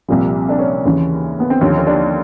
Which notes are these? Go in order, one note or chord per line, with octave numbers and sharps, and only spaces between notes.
C2 A#2 F3 G3
D4
C#4
D#2 C#3 E3
B3
C4
D#2 D3 F3 C#4
C#4
D4